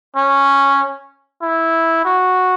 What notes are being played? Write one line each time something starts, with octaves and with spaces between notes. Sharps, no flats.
C#4
E4
F#4